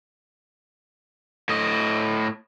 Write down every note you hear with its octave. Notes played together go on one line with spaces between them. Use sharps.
A2 D#5